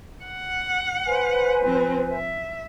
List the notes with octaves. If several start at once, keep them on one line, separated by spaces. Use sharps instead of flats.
F#5
B4 C5 G#5
F3 C4
E5